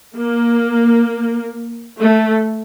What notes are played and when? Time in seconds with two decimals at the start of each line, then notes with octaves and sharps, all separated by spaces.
0.16 A#3
1.97 A3